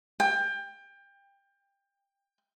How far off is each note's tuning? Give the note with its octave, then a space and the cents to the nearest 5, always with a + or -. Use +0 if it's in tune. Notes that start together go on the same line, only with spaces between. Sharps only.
G5 +25